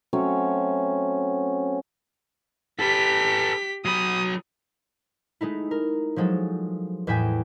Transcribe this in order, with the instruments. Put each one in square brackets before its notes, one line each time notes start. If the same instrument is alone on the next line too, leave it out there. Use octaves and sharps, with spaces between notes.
[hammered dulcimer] F#3 A3 C4 C#4
[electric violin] G4 B6 [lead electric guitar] A4 B4
[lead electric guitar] F#3 B5 [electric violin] D#6
[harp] G#3 A3 D#4 E4
A#4
F3 F#3 G#3 A4
E2 A2 E5 G5 G#5 B6